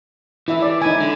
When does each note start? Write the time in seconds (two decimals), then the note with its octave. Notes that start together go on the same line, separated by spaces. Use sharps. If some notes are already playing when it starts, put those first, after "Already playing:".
0.48 E3 E4 E5
0.62 D5
0.82 D#4 E4 G#5
1.00 D3